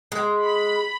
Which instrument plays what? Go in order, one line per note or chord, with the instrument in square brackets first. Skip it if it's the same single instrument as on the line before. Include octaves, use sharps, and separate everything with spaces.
[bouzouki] G#3
[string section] B5